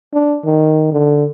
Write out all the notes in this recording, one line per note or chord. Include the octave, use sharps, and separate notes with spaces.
D4
D#3
D3